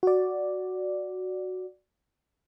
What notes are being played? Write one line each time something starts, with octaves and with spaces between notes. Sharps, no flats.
F#4 D5